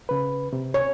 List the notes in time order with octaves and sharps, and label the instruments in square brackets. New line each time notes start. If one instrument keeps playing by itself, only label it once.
[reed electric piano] C#3 B4
C3
[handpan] C#5